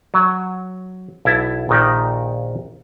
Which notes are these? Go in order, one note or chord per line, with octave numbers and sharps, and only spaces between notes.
F#3
B1 E4 A5
A#1 A#2 D#3 D#4 G4